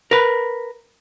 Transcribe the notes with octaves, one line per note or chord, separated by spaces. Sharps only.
A#4 B4